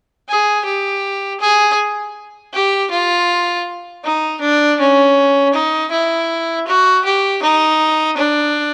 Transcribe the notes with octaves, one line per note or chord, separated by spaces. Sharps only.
G#4
G4
G#4
G4
F4
D#4
D4
C#4
D#4
E4
F#4
G4
D#4
D4